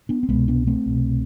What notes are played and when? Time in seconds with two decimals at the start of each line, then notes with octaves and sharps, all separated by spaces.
0.09 B3 D4
0.23 C4
0.29 C2 B2 G#3 B3
0.48 B3 D4
0.67 A3 C4
0.86 C2 B2